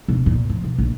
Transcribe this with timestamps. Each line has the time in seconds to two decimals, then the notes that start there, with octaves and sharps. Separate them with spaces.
0.08 E1
0.26 A#2
0.49 F3
0.64 B2
0.78 A#1